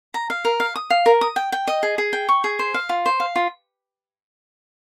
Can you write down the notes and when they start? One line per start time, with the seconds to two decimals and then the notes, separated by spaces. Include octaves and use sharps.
0.14 A#5
0.30 F5
0.45 A#4
0.60 F5
0.76 D#6
0.90 F5
1.06 A#4
1.21 D#6
1.36 G5
1.52 G5
1.68 D#5
1.83 G#4
1.98 G#4
2.13 G5
2.29 C#6
2.44 G#4
2.59 C5
2.74 F5
2.89 F4
3.06 C5
3.20 F5
3.36 F4